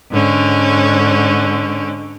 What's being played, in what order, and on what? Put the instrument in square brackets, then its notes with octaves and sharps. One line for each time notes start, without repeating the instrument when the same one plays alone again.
[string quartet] G#2 D3 C#4